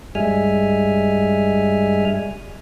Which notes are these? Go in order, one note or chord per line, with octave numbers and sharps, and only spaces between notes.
G2 G3 G#3 E5 G#5 F6